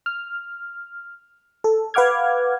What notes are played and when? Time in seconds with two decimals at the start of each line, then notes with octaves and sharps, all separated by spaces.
0.06 F6
1.64 A4
1.94 B4 F5 F#5 D6 F6 G#6